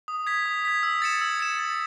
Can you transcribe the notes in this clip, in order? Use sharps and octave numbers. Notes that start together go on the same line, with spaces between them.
D#6
G#6 B6
D#6
G#6 B6
E6
A6 C#7 E7
E6
A6 C#7 E7
A6